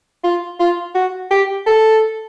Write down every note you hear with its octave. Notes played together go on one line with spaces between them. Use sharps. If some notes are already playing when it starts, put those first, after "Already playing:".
F4
F4
F#4
G4
A4